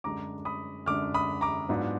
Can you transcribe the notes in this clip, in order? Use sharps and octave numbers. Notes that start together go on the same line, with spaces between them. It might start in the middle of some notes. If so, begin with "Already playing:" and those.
F#2 D3 G#3 D4 A#5 D6
B5 D#6
F#2 D3 G#3 D4 D6 F6
B5 D#6
A#5 D6
G#2 F#3 B3 D4 F4